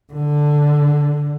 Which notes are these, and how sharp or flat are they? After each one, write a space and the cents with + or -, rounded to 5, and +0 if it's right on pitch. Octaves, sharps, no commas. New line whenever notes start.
D3 +0